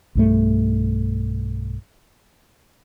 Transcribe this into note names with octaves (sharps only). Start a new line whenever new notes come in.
B1 G2 A3